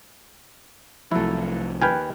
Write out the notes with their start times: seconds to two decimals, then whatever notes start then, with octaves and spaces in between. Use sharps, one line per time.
1.12 C2 F3 F#3 A3 E4
1.81 D#2 B4 G5 G#5 F6